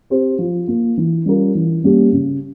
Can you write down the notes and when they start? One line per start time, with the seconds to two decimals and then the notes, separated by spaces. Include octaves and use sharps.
0.10 C4 G4 C5
0.39 F3
0.67 A#3 F4
0.97 E3
1.26 G3 C#4 F4 A#4
1.55 E3
1.84 G3 A#3 C#4 G4
2.12 C#3